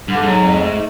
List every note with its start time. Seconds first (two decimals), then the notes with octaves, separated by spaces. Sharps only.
0.08 G2 D3
0.22 G#2 F#3
0.38 F2
0.53 A3